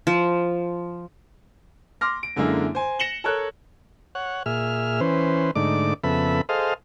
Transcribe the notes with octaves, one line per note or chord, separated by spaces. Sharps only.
F3
C6 D6 F6 A#6
D7
F#2 D3 G#3 A#3 E4
C5 G#5
A#6 C#7 E7 F#7 G7
A4 A#4 C#5 F#6
C#5 F#5
A#2 G#4 E5 F6
E3 C#4 B4 C5
G#2 D3 A3 D#4 D5 D6
F2 C#3 B3 A4 E5 B5
G#4 A4 C5 D#5 F5